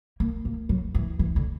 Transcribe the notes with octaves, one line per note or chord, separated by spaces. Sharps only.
A#3
A#3
F#3
E3
E3
D3